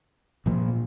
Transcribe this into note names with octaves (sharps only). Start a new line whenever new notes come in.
A#2 F3 A#3